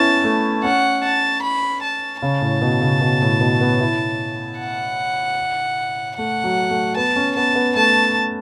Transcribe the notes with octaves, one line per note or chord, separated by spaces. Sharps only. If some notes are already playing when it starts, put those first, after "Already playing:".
Already playing: B3 C#4 E4 A5
A3
C#4 F#5
A5
B5
A5
C#3 A5
A2
B2
C#3
B2
A2
B2
B3
E4
F#5
A3 F#5
F#3
A3
B3 A5
C#4
B3 A5
B3
A3 A5